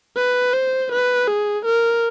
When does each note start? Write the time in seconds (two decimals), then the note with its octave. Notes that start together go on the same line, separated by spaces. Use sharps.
0.17 B4
0.53 C5
0.92 B4
1.28 G#4
1.65 A#4